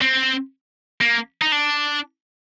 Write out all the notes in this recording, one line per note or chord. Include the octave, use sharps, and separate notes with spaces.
C4
A#3
D#4
D4